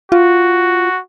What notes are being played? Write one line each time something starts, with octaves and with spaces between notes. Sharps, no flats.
F4 F#4